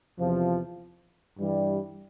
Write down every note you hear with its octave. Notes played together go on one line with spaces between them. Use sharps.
E2 C3 F3
G2 E3 G3